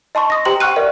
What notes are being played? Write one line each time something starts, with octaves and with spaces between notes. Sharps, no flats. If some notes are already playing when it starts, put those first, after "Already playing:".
D#5 A5 C6 C#6
D#6 A#6
G4 C5 G5 A#5 C6 F#7
F#5 G5 C#6 F6 F#6 D#7
A#4 D5 E5